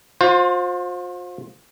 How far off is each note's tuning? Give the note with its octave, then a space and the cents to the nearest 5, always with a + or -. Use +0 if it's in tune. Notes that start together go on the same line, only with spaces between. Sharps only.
F4 +40 C5 +15